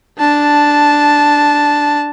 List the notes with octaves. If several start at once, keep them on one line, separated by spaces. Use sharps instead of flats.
D4 A5